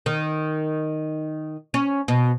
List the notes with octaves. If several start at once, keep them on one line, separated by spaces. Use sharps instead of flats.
D#3
C#4
B2